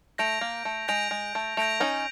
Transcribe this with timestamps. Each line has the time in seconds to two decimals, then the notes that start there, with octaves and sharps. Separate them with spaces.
0.18 A3 G6 A#6 D7 F7
0.41 A#3
0.65 A3
0.88 G#3 G6 A#6 D7 F7
1.11 G#3
1.35 A3
1.57 A3 G6 A#6 D7 F7
1.80 C#4 D#4